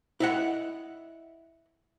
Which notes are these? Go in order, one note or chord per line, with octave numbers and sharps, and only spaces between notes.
E4 D#5 F#5